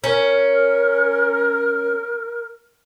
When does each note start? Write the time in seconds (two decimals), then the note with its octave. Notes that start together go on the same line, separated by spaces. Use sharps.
0.04 C#4 A#4